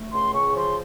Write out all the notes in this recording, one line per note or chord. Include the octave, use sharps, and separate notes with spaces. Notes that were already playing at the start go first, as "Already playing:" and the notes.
Already playing: A3
C#2 C6
C#3 C#6
F3 C6